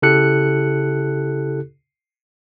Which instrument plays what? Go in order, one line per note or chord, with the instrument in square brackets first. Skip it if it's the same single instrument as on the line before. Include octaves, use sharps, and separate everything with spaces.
[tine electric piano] C#3 E4 G4 A4 F#6 C#7